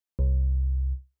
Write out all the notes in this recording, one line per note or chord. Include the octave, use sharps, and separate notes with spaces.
C2